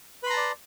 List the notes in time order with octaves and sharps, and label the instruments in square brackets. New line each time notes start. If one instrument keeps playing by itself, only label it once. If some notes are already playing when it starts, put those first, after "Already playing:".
[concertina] B4
C6
A#5
A5
D5